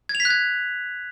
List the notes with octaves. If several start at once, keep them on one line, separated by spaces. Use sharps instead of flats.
G#6
F7
B6
F#6
G#6